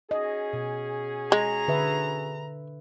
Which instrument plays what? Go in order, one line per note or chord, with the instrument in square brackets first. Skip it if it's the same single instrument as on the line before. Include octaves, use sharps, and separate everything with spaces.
[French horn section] C#4 F#4 G#4 [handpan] D#5
[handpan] B2
[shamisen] G#3 [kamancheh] A#5
[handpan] D3 B4 E5